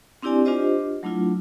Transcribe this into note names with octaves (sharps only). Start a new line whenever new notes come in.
C4 D4 E4 G4 D5 G#5
D4 F4 G4 C5 D#5
F#3 A3 D4 E4 F4